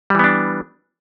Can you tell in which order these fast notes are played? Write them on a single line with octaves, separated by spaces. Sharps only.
G3 E3 B3 D4